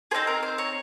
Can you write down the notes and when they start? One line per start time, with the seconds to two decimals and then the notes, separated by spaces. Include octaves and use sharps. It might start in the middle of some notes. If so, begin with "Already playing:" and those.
0.11 C4 D#4 G#4 C5
0.27 A#4
0.43 C5
0.58 C#5